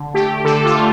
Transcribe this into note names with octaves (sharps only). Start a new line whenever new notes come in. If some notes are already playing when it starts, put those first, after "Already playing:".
Already playing: D3
A3 G4
D3 A4
F4
A3